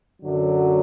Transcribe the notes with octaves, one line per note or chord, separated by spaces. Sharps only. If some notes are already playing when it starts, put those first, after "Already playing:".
F#2 D3 F#3